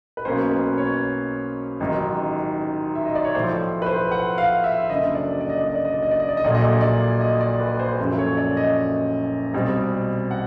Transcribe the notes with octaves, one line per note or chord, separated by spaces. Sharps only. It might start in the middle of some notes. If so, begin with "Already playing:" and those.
B4
B1 B2 F#3 A#3 C#4 C5
B4
C#5
A1 G#2 D#3 F#3
E5
D#5
D5
C#5
B1 A2 F3 C5
B4
C5
F#5
F5
E5
F#1 F#2 D3 D#5
D5
D5
D#5
D5
D#5
D5
D#5
D5
D#5
D5
D#5
D5
D#5
A#1 A#2 F#3 A3 D5
D#5
D5
D#5
D5
D#5
D5
B4
C5
F#1 F#2 C#3 F3 A3
C#5
D5
D#5
B1 B2 G3 C4
F#5